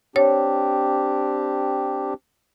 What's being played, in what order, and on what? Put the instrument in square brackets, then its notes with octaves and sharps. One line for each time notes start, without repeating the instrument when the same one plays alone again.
[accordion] C4 D4 G4 [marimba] C#5